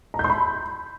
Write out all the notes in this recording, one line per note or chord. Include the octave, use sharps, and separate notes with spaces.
A#5
G6
C6
B5